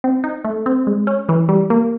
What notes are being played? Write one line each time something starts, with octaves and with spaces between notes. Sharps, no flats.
C4
D#4
A3
C4
G#3
C#4
E3
G3
A#3